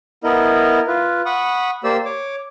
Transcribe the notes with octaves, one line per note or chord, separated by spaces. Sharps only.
B3 E4 A#4 D#5
F4 B4
F#5 B5 C#6 D#6
A#3 G4 C5 D5 E6
C#5 D6